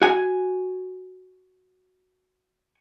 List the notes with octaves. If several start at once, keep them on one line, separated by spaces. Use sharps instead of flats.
F#4 G#5